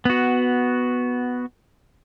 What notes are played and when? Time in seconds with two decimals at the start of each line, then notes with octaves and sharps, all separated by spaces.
0.05 B3 F#4